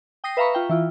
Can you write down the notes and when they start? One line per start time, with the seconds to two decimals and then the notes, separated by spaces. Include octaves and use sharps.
0.24 G5 D#6 A#6 C7
0.37 B4 E5 F5 A#5 B5 C#6
0.54 F4 G5
0.69 E3 E4 F4